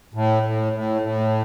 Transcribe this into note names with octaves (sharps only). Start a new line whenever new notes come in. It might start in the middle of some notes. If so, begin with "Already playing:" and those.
A2
A2
A2
A2